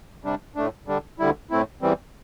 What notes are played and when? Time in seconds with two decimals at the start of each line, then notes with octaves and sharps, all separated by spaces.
0.24 C3 G3 D4
0.55 A2 A3 D4
0.87 D3 G3 D4
1.19 D2 D3 G3 E4
1.50 A2 A3 C4 E4
1.82 E2 E3 G3 C4